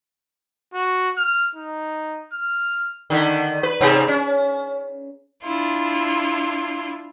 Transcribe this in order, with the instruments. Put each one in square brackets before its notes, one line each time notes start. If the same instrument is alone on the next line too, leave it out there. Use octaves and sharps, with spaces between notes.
[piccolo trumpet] F#4
F6
D#4
F6
[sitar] D3 D#3
B4
G#2 C3 C4
C#4
[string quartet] D4 E4 F4 C6